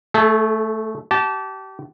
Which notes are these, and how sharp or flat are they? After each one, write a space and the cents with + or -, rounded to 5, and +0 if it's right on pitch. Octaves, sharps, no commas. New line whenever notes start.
A3 +0 A4 -45
G4 -30 A5 -10